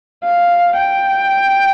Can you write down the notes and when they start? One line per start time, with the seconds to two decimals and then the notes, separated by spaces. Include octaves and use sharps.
0.24 F5
0.76 G5